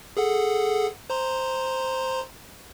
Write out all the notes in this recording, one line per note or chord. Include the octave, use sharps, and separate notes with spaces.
G#4 A4 F#5
C5 A#5 C6